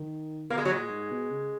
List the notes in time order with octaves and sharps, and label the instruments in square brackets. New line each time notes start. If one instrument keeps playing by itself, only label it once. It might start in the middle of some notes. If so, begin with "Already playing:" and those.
Already playing: [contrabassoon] D#3
[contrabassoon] B2 [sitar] A#3
[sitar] G#3
F#3
[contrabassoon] A#2 [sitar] G#3
[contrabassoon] G#2
B2
C#3